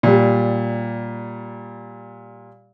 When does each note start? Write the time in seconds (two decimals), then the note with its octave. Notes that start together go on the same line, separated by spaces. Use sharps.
0.03 A#2 G3